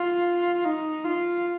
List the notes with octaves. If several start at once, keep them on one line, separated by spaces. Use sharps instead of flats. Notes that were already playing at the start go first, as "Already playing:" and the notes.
Already playing: F4
D#4
F4